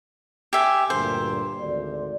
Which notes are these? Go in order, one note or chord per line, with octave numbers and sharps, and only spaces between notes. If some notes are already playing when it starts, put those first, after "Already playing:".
G4 E5 G#5
D2 G2 A#2 C5
G#1 D2 D5